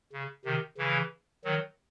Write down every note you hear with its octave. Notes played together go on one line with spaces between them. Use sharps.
C#3
C3 D#3
C#3 E3
D#3 F#3